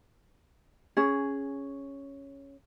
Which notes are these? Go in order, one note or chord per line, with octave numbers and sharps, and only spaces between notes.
C#4 G#4